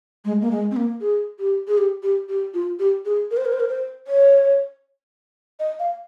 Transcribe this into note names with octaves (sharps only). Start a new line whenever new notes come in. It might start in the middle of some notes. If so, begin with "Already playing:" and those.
G#3
A#3
G#3
C4
A#3
G#4
G4
G#4
G4
G4
G4
F4
G4
G#4
A#4
C5
A#4
C5
A#4
C5
C#5
D#5
F5